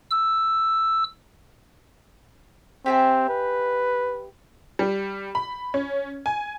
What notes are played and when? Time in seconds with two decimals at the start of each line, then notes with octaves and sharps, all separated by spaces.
0.11 E6
2.86 C4 G4 E5 G#5
3.29 B4
4.79 G3
5.35 B5
5.74 C#4
6.26 G#5